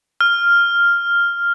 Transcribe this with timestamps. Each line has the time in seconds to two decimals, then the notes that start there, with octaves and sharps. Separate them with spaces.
0.21 F6